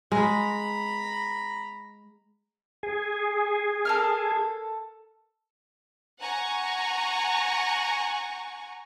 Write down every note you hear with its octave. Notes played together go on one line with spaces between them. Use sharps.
G#3 A#5 B5
G#4
A4 A#4 F6
F#5 G#5 A#5 C#6